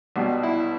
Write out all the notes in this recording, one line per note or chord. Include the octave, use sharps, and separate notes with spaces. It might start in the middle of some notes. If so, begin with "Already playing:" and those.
B1 B2 G3 D4
E4